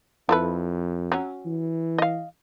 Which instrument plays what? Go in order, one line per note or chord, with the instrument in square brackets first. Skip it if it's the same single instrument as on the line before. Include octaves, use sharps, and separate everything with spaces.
[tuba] F2 [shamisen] E4 A4 B4
[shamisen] F#3 C#4
[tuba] E3
[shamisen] D#5 F5